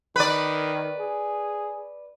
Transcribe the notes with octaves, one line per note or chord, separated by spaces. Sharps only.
D#3 B4 D5
G#4